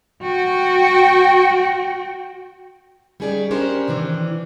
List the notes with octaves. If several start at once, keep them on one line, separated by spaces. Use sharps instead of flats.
F#4 G5
G3 C#4 D#4 G#4 B4 D5
C#4 D4 G4 A#4 C5
C3 D#3 E3 D4